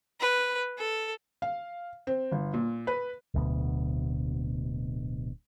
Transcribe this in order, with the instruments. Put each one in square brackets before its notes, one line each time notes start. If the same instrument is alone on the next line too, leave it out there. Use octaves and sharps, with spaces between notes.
[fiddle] B4
A4
[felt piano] F5
C4
G1
A#2
B4
[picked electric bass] D1 D2 B2